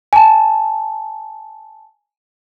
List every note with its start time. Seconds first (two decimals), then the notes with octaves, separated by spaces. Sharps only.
0.13 G#5 A5